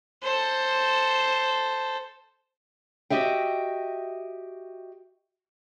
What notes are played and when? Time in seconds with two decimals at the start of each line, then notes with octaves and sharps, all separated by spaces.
0.23 A4 C5
3.10 F#4 G4 D#5 E5 G5